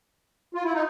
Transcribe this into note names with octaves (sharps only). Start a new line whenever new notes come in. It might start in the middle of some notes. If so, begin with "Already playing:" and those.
F4
E4
D#4